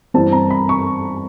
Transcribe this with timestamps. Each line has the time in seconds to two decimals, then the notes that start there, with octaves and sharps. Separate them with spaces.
0.14 G2 E3 G3 C4 A5
0.32 A#5
0.50 B5
0.69 C#6